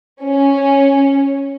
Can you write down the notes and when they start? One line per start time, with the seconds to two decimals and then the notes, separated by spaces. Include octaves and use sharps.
0.22 C#4